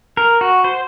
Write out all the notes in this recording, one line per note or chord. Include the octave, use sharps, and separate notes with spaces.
A#4
F#4
C5